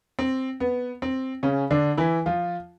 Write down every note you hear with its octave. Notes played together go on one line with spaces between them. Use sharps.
C4
B3
C4
C#3 C#4
D3 D4
E3 E4
F3 F4